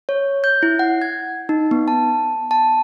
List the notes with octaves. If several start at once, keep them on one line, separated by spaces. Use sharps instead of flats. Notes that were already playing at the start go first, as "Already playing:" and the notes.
C#5
G6
E4
F#5
G#6
D#4
B3
A5
A5